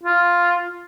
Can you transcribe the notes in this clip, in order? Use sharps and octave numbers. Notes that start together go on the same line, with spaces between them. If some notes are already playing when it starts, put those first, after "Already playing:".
F4